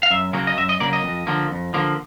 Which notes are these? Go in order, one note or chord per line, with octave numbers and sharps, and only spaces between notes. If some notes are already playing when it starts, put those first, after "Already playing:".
F5
F#2 E5
C#3 F#3 A#3
D#5
F#2 E5
D#5
C#3 F#3 A#3 D5
D#5
F2
D3 F3 A#3
F2
D3 F3 A#3